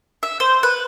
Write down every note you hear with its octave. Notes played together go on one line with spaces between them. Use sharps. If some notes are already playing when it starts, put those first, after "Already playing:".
E5
C5
B4